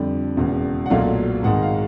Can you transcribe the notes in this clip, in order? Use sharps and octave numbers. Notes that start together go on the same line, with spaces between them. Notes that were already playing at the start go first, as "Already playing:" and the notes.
Already playing: F2 D3 G3
E1 E2 C#3
F#5
B1 A#2 F#3 A3 F5
G#1 G#2 D#3 G#3 F#5
F5